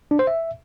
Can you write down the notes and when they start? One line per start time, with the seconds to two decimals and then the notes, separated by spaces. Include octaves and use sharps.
0.11 D4
0.19 C5
0.27 E5